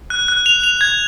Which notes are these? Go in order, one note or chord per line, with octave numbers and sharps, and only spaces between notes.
F#6
F#6
F7
F7
G#6